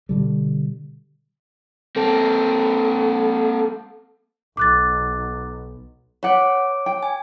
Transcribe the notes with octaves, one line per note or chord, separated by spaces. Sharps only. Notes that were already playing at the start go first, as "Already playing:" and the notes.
B2 D3 G3
A#3 C4 A4
B1 D6 F#6 A6
B4 C#5 F#5 D6
G5
G#5